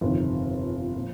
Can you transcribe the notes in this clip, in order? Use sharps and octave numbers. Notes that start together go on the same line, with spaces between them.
G1 F2 C3 D#3
A#2 F3